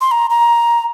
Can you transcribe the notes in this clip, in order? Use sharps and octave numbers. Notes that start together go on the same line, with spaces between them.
C6
A#5
A#5